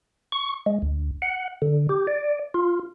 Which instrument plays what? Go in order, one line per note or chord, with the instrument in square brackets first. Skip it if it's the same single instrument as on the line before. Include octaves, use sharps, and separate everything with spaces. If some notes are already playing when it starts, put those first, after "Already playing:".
[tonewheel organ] C#6
G#3
D2
F#5
D3
G4
D5
F4